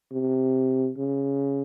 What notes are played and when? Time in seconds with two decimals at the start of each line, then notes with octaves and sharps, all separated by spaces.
0.11 C3
0.98 C#3